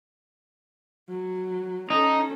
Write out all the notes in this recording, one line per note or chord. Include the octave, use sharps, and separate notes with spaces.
F#3
C#4 D#4 A4